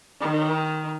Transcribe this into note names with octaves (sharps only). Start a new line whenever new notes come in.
D#3